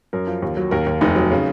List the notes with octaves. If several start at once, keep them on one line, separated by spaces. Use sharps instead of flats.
F#2 A#4
F3
D#2
F#3
D#2 A#4
D#2
F1 D#4
F#3
C#3